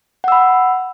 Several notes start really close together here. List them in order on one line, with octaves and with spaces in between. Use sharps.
F#5 E6 B5